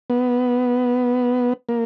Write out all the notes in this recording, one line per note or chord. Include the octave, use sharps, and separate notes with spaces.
B3
A#3